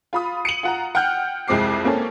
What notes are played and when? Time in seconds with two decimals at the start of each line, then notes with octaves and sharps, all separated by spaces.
0.13 F4 B5 D#6
0.45 C#7 D#7 F#7
0.63 F4 F#5 A#5
0.95 F#5 G5 F6 G6
1.48 C2 F2 G#3 C4 D6 C7
1.85 A#3 C4 C#4 A4